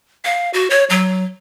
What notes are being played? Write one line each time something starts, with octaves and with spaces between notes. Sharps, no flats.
F5
F#4
C#5
F#3